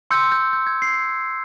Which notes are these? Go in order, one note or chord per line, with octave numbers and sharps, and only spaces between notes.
C6 E6 G6 C#7
G6
G6
G#6
C7